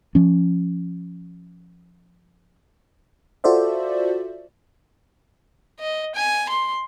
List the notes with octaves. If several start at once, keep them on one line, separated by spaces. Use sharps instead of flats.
F3 C#4
F4 F#4 A4 C5 D5 E5
D#5
G#5
C6